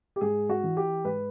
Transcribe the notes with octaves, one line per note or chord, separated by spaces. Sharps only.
G4
G#2 G#4
F#4
E3
G4
G#2 B4